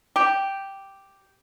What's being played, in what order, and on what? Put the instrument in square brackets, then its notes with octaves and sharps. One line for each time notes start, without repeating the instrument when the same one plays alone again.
[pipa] G4